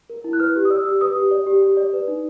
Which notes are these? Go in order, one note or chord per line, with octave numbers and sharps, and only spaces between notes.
A#4
E4
F#6
B4 F6
G4
D#6
D5 E6
G4
B4 D#6
G4
D5
G4
G4
D5
B4
D#4